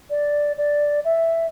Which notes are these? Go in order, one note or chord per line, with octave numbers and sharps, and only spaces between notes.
D5
D5
E5